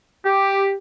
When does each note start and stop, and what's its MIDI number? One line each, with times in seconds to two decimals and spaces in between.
0.24 0.73 67